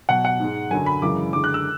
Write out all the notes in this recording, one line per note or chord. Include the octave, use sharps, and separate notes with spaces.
B2 F#3 F#5
F#5
G#2 G#3
F#2 D3 F#3 G#5
B5
F#2 C#3 E3 G#3 D6
F#2 D3 G#3 D6
F#6
E6